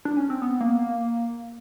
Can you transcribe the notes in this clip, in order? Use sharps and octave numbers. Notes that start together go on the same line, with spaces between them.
D4
C#4
C4
B3
A#3